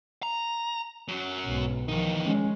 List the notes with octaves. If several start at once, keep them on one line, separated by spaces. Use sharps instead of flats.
A#5
F#2 F#3
B1 G#2
E2 D#3 F3 D#4
G#3 C#4